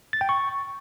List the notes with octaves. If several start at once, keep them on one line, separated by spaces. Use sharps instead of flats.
A6
G5
C#6